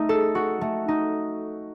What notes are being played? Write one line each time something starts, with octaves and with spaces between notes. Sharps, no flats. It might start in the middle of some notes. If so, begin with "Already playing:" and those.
Already playing: A3 D#4
A4
F#4
A3
D#4